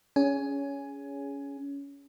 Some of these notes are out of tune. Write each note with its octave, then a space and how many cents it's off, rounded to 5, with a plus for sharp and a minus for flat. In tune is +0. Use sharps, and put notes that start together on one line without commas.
C#4 +20 G#4 +0 G#5 +0